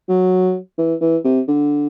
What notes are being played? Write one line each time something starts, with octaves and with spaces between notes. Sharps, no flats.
F#3
E3
E3
C3
D3